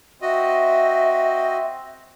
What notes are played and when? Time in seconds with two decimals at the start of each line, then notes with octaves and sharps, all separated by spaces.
0.22 C4 F#4 D#5 E5